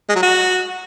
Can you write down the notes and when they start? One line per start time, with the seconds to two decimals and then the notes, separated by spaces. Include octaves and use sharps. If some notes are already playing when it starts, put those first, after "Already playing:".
0.09 G#3
0.16 F#3
0.23 F#4